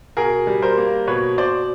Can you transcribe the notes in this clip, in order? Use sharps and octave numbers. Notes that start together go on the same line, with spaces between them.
B2 G#4 A#4
G3
A#4 C5
A#3
B2 B4 C#5
B2 C5 D5